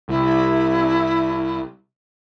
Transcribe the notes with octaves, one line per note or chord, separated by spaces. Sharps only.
C2 E4